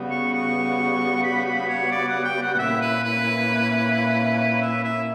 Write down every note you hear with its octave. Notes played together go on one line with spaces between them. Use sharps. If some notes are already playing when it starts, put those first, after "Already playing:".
Already playing: C#3 G3 B3 F#4
C#6
C#6
B5
B5
C#5
D5
F#5
G5
F#5
F#5
A#2 A#3 C#4 E4 E5
B4
B4
E5
E5